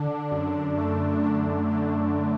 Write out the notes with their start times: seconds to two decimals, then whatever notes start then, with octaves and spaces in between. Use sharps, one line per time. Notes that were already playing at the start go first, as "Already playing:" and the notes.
Already playing: D3 D4
0.31 F#2
0.77 A3
1.24 D4
1.71 D3